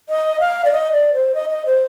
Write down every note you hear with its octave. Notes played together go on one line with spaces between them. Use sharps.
D#5
F5
D5
D#5
D5
C5
D#5
D#5
C5